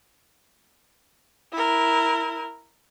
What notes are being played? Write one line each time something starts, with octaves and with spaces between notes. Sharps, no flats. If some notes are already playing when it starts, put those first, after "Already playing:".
E4 A#4